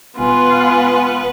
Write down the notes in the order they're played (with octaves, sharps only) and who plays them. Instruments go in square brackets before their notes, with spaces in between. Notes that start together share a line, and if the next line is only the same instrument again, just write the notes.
[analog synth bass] E1 [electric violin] B3 B4 [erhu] F4 [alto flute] G#5